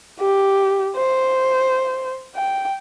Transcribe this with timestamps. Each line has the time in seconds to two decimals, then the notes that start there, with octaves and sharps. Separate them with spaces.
0.20 G4
0.96 C5
2.35 G5